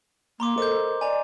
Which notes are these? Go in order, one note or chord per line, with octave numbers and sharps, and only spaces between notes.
A#3 A#5 C6 D6
A4 A#4 C5 D#5 D6 G6
D5 D#5 G#5 A#5